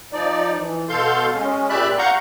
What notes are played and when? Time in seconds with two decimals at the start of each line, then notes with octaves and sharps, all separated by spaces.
0.13 F3 D#4 D5
0.57 E3
0.89 B2 A4 F5 C6 G6
1.34 G#3 C#4
1.69 A#2 G4 D5 E5 B5 F#6
1.98 F5 F#5 A#5 C#6 G6